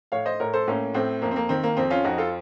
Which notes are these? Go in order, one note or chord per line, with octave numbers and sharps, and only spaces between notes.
A2 C#5 F5
C5 D#5
A2 A#4 C#5
A4 C5
A2 A#3 C#4
A2 C4
F2 A#3
C4
A#3
D#3 C4
A#3
F2 C4
C#4 F4
F2 D#4 F#4
F4 A4